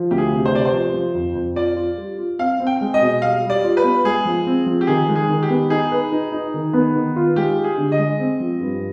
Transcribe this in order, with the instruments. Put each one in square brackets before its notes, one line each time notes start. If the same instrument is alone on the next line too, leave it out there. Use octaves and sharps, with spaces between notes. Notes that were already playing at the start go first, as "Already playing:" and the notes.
Already playing: [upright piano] F3
[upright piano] D2 [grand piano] G4
[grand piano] G#4
[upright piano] C3
[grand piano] C5
[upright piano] C3 [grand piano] D5
[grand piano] C5
[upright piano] F3
F3
F2
F2
[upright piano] F4 [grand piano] D5
[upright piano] F4
G3
F4
[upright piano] C4 [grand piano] F5
[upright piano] C4
[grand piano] G5
[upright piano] G#3
[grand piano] D#5
[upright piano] B2
[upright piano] G3 [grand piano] F5
[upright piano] G3
[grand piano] D5
[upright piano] F4
[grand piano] B4
[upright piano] B3
[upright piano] G#3 [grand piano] G#4
[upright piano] F3
C4
F3
[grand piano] G4
[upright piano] D#3 [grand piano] G#4
[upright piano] G#3
[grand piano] G#4
[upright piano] D#3
[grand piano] G4
[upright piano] B3
[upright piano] D#4 [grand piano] G#4
[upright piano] B4
D#4
D#4
D#3
B3
D#3
F4
[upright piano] G#3 [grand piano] G4
[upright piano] G4
[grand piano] G#4
[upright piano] D3
[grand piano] D#5
[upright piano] G#3
C4
F3
G2